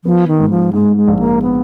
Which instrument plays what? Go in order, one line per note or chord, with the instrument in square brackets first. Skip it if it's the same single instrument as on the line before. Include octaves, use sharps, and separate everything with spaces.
[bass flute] F3 [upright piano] B3
[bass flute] D#3
[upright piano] G#2
[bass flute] F3
[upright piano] G#2 [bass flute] G#3
[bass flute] G#3
[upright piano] A#1
[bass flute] A#3
B3